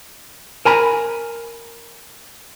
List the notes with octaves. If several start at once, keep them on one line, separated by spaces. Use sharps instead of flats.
A#4 G#5 A#5 B5